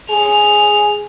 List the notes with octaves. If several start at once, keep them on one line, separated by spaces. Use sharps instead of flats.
G#4 F7